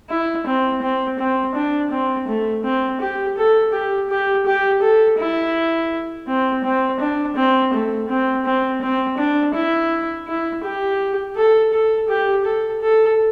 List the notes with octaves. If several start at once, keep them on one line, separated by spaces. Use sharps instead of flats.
E4
C4
C4
C4
D4
C4
A3
C4
G4
A4
G4
G4
G4
A4
E4
C4
C4
D4
C4
A3
C4
C4
C4
D4
E4
E4
G4
A4
A4
G4
A4
A4